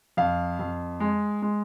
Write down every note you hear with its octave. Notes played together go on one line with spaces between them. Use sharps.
F2 F5
F2
G#3
G#3